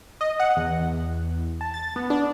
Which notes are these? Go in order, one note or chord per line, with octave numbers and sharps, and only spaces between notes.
D#5
F#5
E2
A5
A6
B3
D4